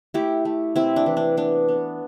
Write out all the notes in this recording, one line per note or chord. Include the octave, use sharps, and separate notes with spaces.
A3 E4 G4
A3
C3 C4 E4
D4
E3
D4
B3 D4
B3